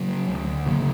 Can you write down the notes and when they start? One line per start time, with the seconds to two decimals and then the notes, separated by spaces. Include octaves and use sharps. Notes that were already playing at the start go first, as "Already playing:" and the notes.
Already playing: C#3 F#3
0.29 D2
0.66 C#3 F#3 A#3